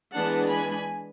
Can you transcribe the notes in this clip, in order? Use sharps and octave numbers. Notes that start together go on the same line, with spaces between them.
E3 G#3 B3 D4 F#5 A5
G#5 B5